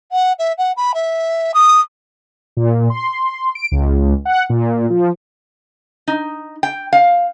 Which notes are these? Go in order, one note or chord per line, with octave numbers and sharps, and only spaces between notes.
F#5
E5
F#5
B5
E5
D#6
A#2
C6
D7
C#2
F#5
A#2
F3
D#4
G5
F5